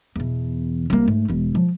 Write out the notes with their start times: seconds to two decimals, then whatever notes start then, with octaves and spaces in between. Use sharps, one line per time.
0.16 E2 B2
0.90 C2 A#3
1.08 G#2 A3
1.28 E1 E3
1.55 F3